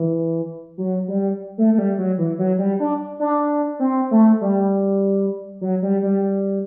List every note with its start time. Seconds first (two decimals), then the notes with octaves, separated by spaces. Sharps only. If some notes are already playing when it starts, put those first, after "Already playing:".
Already playing: E3
0.78 F#3
1.08 G3
1.58 A3
1.74 A3
1.78 G3
1.98 F#3
2.18 E3
2.39 F#3
2.58 G3
2.80 D4
3.20 D4
3.79 C4
4.11 A3
4.41 G3
5.61 F#3
5.82 G3
6.02 G3